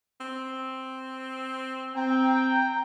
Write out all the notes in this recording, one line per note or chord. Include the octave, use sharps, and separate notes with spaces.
C4
C4 G5 A#5